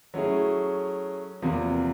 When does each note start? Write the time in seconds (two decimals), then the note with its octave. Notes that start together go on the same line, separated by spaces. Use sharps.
0.14 F#3 A3 C#4 E4 G#4
1.42 E2 C3 F3 A#3